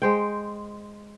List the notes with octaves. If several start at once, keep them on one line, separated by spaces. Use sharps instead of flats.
G#3 C5 G5